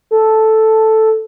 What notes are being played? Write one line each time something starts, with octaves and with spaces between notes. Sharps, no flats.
A4